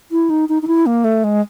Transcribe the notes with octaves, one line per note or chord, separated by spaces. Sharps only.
E4
D#4
D#4
D#4
E4
A#3
A3
G#3